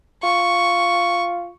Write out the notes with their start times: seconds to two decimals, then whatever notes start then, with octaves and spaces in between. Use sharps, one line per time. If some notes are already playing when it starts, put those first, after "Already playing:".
0.23 F4 C#6